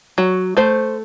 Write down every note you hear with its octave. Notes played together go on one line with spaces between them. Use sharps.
F#3
A3 C5